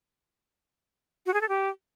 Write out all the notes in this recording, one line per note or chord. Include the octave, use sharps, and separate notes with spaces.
F#4
G#4
A4
G4